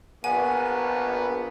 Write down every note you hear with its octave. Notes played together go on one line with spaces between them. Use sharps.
A#1 B3 F#5 G#5